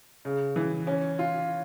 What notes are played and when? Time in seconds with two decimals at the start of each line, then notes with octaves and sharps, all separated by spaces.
0.25 C#3
0.56 E3
0.87 C#4
1.19 F4